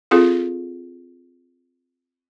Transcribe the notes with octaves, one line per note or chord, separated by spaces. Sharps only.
C4 F4 G#4 A4